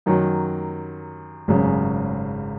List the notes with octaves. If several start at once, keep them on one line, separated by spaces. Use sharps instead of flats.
F#2 D#3 F#3
G#1 F#2 C#3